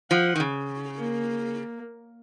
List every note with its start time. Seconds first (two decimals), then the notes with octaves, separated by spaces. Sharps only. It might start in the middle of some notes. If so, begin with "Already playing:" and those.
0.11 F3 F#5
0.36 D#3
0.40 C#3
0.98 A#3